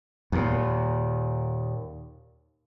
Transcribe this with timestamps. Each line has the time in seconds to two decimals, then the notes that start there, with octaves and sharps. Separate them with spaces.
0.32 D#2 A#2